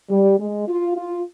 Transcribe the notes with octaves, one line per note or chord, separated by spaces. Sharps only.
G3
G#3
F4
F4